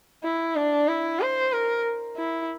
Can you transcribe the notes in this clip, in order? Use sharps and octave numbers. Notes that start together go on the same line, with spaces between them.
E4
D4
E4
C5
A#4
E4